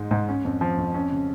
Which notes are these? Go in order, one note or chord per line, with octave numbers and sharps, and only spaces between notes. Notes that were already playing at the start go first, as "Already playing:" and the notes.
Already playing: G#2 G#3 D#4
G#2
C#4
F2
F3
F2
C#4
C#3